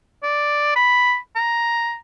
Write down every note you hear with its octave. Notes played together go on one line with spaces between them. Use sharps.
D5
B5
A#5